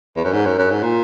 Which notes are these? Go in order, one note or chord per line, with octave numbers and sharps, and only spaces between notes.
E2
F#2
G#2
F#2
F#2
G#2
A#2